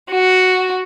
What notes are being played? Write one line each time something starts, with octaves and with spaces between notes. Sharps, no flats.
F#4